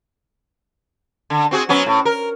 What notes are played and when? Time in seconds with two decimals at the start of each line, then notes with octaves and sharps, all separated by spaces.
1.30 D3
1.51 C4 F#4 G#4
1.69 F#3 B3 C#4
1.86 A2
2.05 A#4